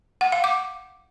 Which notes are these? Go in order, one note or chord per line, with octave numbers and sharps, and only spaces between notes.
F#5
F5
D6